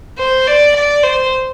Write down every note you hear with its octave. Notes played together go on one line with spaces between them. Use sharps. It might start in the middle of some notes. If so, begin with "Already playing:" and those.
C5
D5
D5
C5